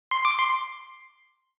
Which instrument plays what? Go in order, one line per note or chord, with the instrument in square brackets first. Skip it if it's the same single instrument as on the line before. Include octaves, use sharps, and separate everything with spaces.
[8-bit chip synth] C6
D6
C6